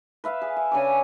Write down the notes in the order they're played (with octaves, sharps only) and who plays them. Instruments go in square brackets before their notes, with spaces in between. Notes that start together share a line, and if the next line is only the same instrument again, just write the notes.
[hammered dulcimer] B4 E5 F5
G#4
E5
[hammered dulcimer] C#3 D4 D6 [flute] G#5